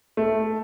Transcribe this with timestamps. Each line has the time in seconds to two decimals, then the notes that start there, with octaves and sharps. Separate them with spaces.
0.17 A3